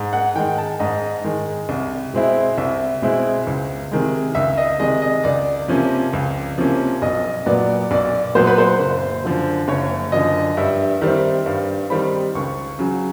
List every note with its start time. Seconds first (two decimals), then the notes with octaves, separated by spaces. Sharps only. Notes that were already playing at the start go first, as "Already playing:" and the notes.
Already playing: G#2
0.13 F#5
0.36 D#3 G#3 G5
0.58 A5
0.80 G#2 D#5
1.24 D#3 G#3
1.69 C2
2.13 B2 G#3 C4 E4
2.58 C2 E5
3.02 B2 G#3 C4 E4
3.47 C#2
3.91 C3 D#3 G#3
4.35 C#2 E5
4.57 D#5
4.79 C3 D#3 G#3 D#5
5.02 D#5
5.24 C#2 D5
5.68 C3 F3 A#3 C#4
6.13 C#2
6.58 C3 F3 A#3 C#4
7.02 B1 D#5
7.46 A#2 F#3 B3 D5
7.91 B1 D5
8.35 A#2 F#3 B3 C5
8.47 B4
8.58 C5
8.80 F#1
9.24 F#2 D3 F3
9.68 F#1 C#5
10.12 F#2 D3 F3 D#5
10.57 G2 E5
11.01 D#3 G3 C4 E5
11.46 G2 F5
11.90 D#3 G3 C4 B5
12.35 C#2 C#6
12.79 C#3 F#3